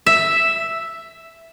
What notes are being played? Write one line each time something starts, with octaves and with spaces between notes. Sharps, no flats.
E5